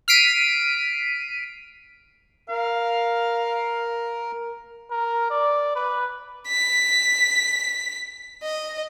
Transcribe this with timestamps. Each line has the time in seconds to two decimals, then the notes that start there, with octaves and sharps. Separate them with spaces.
0.08 F6 B6 C7 D7 D#7
2.50 A#4 F5
4.91 A#4
5.30 D5
5.76 B4
6.48 B6
8.43 D#5